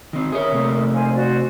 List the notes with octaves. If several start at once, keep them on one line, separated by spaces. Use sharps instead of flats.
D#3 C4
G#4 A#4 C#5 E5 D#6
C3 A3 A#3
C5 F5 G#5
F#4 C5 D5